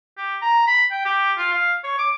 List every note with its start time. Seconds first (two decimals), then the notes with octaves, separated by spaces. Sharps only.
0.17 G4
0.42 A#5
0.67 B5
0.91 G5
1.05 G4
1.38 F4
1.53 F5
1.84 C#5
1.98 D6